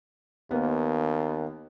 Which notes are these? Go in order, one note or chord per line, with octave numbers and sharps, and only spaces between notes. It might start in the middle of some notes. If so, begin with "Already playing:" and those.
D#2 A#3 B3